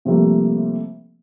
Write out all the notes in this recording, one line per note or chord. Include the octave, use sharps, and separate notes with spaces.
C3 F3 G3 A3 A#3